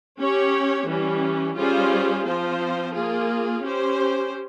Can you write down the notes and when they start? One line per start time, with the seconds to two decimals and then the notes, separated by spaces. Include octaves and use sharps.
0.19 C#4 G4 C#5
0.87 E3 G3 C#4
1.56 G3 C#4 F4 G#4 C5
2.25 F3 C4 F4 C5
2.93 A#3 F4 G#4
3.62 C#4 G4 C5